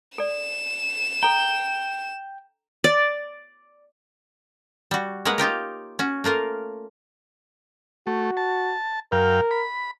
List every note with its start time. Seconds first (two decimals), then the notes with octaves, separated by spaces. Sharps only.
0.18 A4 D5 E7
1.23 A4 G5 A#5
2.84 D5
4.91 G3 F#4
5.25 G#3 A#3 B4 C#5 F#5
5.38 D#4 F4 G4 A#4
5.99 C#4 F#4
6.24 A3 A#3 F4 A#4
8.07 A3 F#4
8.37 A5
9.12 F#2 A#4 F5 G5
9.51 B5